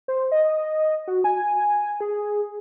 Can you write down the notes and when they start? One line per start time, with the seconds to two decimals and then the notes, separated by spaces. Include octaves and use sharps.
0.08 C5
0.32 D#5
1.08 F#4
1.24 G#5
2.00 G#4